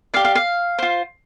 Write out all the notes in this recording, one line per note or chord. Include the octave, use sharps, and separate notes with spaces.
G4 D5 F5
F5
F5
F4 C5